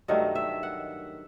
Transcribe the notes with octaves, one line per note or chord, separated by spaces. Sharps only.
G2 D#3 F#3 A3 D#5
E5
F#5